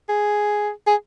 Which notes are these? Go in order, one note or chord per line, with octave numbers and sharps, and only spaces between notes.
G#4
G#4